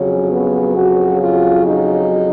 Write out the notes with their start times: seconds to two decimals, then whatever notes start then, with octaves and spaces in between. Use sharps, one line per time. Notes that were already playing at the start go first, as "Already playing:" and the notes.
Already playing: F2 C#3 F#3 C#4
0.30 B3
0.76 F#4
1.22 F4
1.67 D#4